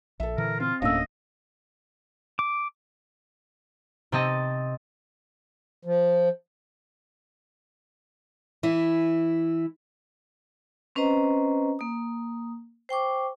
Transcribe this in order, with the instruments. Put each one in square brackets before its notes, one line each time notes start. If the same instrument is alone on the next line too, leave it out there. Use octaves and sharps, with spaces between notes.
[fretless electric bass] A#1 [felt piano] A4 E5
[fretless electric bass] A#2 D3 E3 [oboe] A#4
[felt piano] C4 [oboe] F4
[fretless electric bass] D1 D4 [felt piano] A2 A#3 C#4 [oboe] D#5 [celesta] F5 E6
[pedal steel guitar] D6
[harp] C3 C4 D#5 A5
[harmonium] F3
[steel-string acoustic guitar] E3 E4
[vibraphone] C4 C#4 B4 C5 D#5 A#5
A#3 D#6
C5 G5 C#6 D6